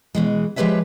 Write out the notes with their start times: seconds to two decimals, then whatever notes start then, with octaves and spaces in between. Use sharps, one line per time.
0.15 B2 E3 G#3
0.56 F3 G#3 G4 B4 C#5 E5